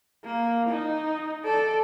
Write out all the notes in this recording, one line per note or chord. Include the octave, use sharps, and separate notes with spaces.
A#3
D#4
A4 D5